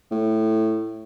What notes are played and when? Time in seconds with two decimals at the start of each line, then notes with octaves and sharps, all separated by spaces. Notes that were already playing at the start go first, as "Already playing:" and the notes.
0.11 A2